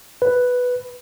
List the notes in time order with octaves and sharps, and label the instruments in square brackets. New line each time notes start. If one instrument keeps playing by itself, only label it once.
[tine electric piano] B4